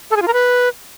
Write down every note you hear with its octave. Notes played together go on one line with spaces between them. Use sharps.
A4
G#4
F4
A#4
B4